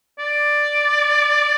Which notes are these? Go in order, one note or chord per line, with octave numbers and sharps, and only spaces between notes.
D5